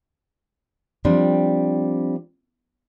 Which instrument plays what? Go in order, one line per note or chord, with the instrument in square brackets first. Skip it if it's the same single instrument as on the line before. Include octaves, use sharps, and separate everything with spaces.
[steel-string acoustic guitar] F3 G3 C4 D4